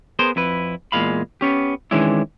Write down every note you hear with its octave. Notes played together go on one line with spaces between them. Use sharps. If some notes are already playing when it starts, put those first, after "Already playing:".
B3 G#4 A#4 C5
F2 E4 B4
E2 A#2 G#3 F5 B5
B3 C#4 G4
D#3 E3 G#3 C#4 D4 E4